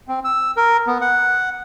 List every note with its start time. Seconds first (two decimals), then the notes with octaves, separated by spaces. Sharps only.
0.08 C4
0.24 E6
0.57 A#4
0.87 B3
1.01 F#5